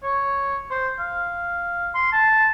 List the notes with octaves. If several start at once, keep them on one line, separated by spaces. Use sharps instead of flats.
C#5
C5
F5
C6
A5